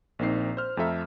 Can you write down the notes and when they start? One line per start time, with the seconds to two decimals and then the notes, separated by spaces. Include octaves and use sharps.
0.19 A#1 A#3 C4 D#4 C7
0.57 C5 F6
0.77 F2 A3 F4 A4 E5 A#5